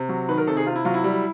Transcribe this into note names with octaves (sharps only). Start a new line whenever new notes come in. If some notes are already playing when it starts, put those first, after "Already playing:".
Already playing: C3
F#3
D#3 B4
A#4
C3 A4
G#4
C3 F4
E4
F#3 F4
E4
G3